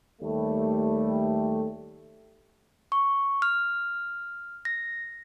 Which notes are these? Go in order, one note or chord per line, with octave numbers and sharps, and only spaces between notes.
D#2 G3 A3
C#6
F6
A#6